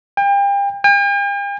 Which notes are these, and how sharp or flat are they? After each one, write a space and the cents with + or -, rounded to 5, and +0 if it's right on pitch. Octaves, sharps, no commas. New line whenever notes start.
G5 +35
G5 +45